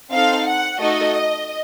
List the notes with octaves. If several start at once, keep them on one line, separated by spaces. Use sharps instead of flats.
C4 D#4 A4 F5
F#5
A3 D#4 F#4 A4 D#5